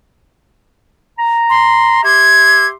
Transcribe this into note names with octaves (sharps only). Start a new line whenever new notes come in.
A#5
C6
G4 E5 C6 G#6